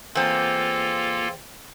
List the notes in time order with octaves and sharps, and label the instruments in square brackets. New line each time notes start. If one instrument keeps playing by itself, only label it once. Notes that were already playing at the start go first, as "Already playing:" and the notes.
[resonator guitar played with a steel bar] E2 C4 [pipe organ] A#3 F4 A4